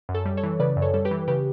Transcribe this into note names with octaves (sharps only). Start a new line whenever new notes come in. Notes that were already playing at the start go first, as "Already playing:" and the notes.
F#2
A4 C#5
G3
A4 C#5
E3
C#3 B4 D5
F#2
A4 C#5
G3 A4
G4 B4
E3
C#3 G4 B4